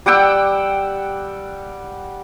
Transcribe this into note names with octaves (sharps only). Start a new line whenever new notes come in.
G3 F#5 G5 E6